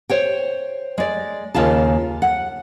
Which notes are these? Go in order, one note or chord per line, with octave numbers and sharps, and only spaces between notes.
C5 C#5 G5
G#3 D5
D#2 C#3 F4 A5
F#5